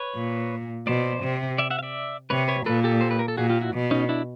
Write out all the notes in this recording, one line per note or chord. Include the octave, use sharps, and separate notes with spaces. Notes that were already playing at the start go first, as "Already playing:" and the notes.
Already playing: B4 C#5
A#2
B2 C5 D5
C3
D5 E5
E5 F#5
F5
D5 E5
C3 B4 C#5
B4 C#5
A#2 A4 B4
G4 A4
C5
B4
A#4
A4
A#2 F#4 G#4
F4 G4
E4 F#4
B2
C#4 D#4
D4 E4